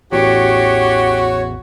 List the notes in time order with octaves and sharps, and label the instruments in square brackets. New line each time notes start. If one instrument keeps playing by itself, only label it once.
[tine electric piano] A1 E2 [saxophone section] F#4 [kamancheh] G4 [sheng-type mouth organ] C#5